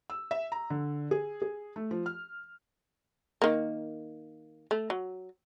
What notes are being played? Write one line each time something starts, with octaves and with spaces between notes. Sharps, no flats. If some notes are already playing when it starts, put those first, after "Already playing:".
E6
E5
A#5
D3
G#4
G#4
A3
F3
F6
D#3 A#3
A3
F#3